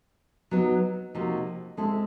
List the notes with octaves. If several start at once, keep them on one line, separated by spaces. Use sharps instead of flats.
F#3 B3 D#4
C3 F3 A#3 D#4 F#4
G#3 C4 E4 A4